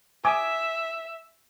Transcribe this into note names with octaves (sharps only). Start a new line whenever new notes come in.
E5 G#5 D6 D#6